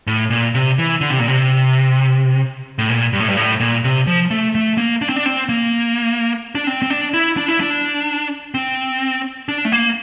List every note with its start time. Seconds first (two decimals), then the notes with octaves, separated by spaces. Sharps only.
0.07 A2
0.30 A#2
0.54 C3
0.78 E3
1.01 D3
1.10 C3
1.19 A#2
1.28 C3
2.78 A2
2.90 A#2
3.13 G2
3.20 A2
3.28 G2
3.37 A2
3.60 A#2
3.84 C3
4.07 F3
4.31 A3
4.55 A3
4.78 A#3
5.02 D4
5.09 C4
5.16 D4
5.26 C4
5.49 A#3
6.55 D4
6.67 C4
6.83 C4
6.90 D4
7.14 E4
7.37 D4
7.48 E4
7.60 D4
8.54 C4
9.49 D4
9.65 A3
9.72 A#3